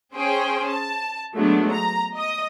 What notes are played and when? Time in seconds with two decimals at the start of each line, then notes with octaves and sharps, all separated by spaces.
0.15 C#4 G#4 C5 G5
0.68 A5
1.34 F#3 G#3 A3 B3 D4
1.71 A#5
2.15 D#5 D#6